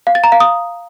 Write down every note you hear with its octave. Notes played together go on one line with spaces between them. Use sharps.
F5
A6
A#5
F5
D#6